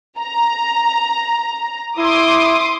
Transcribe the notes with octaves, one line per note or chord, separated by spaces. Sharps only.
A#5
E4 C6 D6 D#6